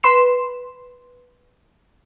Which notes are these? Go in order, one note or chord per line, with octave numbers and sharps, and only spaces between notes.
B4 B5 C6 C7 E7